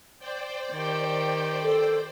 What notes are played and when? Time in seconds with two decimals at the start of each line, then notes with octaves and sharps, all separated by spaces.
0.19 C5 D5 G5
0.72 D#3 G4
1.63 A4